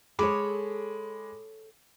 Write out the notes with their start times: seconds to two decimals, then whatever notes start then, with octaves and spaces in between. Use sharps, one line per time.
0.19 G#3 G#4 A4 C#5 B5 D6